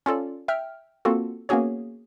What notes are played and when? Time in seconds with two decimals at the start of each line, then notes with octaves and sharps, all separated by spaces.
0.06 C#4 F4 A4 D5
0.48 E5 G5 F6
1.05 A#3 C4 F4 F#4 A4
1.49 A#3 B3 C#4 F#4 G#4 C#5